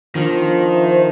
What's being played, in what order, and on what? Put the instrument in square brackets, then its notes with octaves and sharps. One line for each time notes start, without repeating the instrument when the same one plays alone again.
[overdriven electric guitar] D#3 [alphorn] F3 [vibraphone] B3 D4 F4
[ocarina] C5 [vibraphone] E5